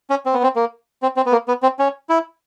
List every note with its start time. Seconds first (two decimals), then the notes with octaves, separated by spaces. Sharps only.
0.10 C#4
0.26 C4
0.34 B3
0.43 C4
0.56 A#3
1.02 C4
1.17 C4
1.26 B3
1.32 A#3
1.48 B3
1.63 C4
1.79 C#4
2.09 E4